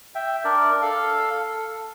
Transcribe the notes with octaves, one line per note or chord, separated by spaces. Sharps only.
E5 G5
D4 A#4 D5
A4 F5
A4